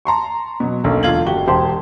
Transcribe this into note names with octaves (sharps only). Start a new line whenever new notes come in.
A5 A#5 C6 C#6
B2 F#3
B1 D3 A#3 C#4 A4
E1 D3 F4 G#6 F#7
F#1 F#4 G4 G7
E1 G4 C5 A5 C6